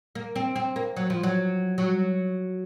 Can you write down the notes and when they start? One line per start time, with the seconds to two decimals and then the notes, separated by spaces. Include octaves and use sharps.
0.15 A#3
0.36 C4
0.56 C4
0.76 A#3
0.97 F#3
1.10 F3
1.23 F#3
1.78 F#3